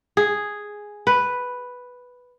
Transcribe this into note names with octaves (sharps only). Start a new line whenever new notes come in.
G#4
B4